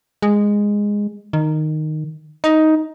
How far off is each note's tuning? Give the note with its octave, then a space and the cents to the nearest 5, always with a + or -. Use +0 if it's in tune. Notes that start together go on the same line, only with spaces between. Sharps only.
G#3 -10
D#3 -10
D#4 +10